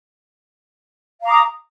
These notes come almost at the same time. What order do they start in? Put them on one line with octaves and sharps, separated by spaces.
F5 A#5 D6 D#6